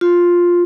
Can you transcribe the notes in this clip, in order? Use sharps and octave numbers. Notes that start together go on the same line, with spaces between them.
F4